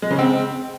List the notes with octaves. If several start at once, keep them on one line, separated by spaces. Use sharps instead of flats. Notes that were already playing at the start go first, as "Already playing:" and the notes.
G#3
C#3
C4